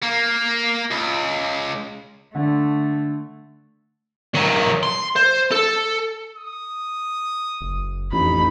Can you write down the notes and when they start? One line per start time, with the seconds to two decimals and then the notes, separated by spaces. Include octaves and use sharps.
0.03 A#3
0.91 C#2
2.35 D3 A3
4.35 D#3 F#3
4.83 C6
5.16 C5
5.51 A4
6.35 D#6
7.61 F#1
8.12 A1 F2 D#4 B5